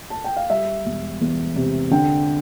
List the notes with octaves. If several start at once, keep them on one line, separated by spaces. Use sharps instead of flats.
A5
G5
F5
G3 E5
E1
E2
C3
D3 G5